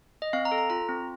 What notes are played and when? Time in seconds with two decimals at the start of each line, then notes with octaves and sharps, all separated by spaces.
0.22 D#5
0.33 C4 F5
0.45 A#5
0.52 A4
0.58 A#5
0.70 F4 A#5
0.88 C4